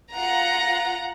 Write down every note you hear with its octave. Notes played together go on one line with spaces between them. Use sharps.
F4 F#5 A#5